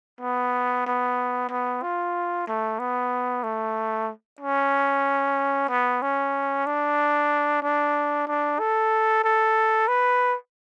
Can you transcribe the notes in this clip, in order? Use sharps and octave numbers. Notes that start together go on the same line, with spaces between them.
B3
B3
B3
F4
A3
B3
A3
C#4
B3
C#4
D4
D4
D4
A4
A4
B4